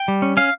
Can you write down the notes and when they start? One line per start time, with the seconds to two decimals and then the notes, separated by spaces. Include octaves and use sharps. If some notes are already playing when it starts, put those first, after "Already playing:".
Already playing: G5
0.08 G3
0.22 C#4
0.37 C#4 F5